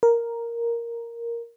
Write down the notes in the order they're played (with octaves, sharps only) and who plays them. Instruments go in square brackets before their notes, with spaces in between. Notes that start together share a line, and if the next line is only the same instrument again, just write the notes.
[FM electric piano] A#4